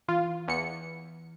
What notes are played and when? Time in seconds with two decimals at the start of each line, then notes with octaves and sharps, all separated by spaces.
0.08 E3 F4
0.48 E2 C#7